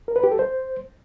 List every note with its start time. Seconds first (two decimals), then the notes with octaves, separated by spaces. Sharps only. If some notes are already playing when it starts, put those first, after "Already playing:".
0.08 A#4
0.16 B4
0.24 G4
0.31 A4
0.39 C5